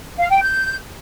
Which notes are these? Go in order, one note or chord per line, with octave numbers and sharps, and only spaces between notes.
F5
G5
G6